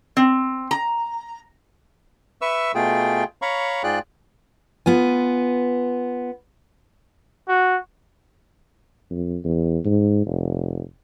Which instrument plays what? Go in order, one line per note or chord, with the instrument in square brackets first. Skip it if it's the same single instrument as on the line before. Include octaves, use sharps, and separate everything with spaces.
[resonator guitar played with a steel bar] C4
A#5
[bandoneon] B4 E5 C#6 E6
B2 A3 F4 G#4 G5
C#5 F5 A#5 B5 C#6
G#2 F4 G#4 D5 G5 F#6
[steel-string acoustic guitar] B3 F4 G#5
[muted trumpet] F#4
[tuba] F2
E2
G#2
F1